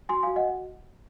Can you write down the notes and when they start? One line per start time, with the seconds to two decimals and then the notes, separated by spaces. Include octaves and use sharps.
0.09 F#4 G#5 C6
0.23 F#4 F5 G#5
0.36 D#5 F#5